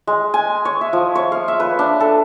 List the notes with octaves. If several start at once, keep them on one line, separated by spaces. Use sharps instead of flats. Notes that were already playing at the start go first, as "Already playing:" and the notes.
G#3
G#5
C#5
E5
F3
C#5
F5
E5
B4
D4
A4